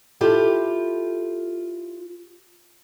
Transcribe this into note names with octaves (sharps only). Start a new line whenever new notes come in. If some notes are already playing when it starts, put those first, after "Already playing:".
E4 F4 G4 A4